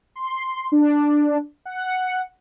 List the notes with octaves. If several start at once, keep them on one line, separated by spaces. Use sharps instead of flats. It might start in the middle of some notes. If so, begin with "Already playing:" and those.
C6
D4
F#5